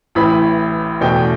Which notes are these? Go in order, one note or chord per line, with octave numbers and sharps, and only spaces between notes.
A1 A2 E3 B5
E2 B2 A3 G5